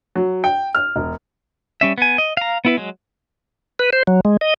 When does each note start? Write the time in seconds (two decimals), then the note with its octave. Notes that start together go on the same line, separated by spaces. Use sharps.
0.16 F#3
0.44 G5
0.75 F6
0.96 E1
1.81 G3 C#4 E5
1.98 B3 G#5
2.18 D#5
2.37 F5 A#5
2.65 B3 E4 B4
2.77 F#3 G#3
3.79 B4
3.93 C5
4.07 F#3
4.25 G#3
4.41 D#5